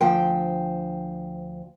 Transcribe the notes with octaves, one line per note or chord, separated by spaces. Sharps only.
D2 F3 C5 G5